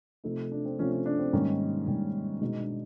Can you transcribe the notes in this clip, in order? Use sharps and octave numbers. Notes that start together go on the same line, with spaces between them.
C3 F3 A3 D#4
D4
C4
C3 F3 A3 C#4
C#4
D4
C4
G#2 D#3 G3 A#3 C#4
G#2 D#3 G3 A#3
B2 G#3 B3 D#4
D4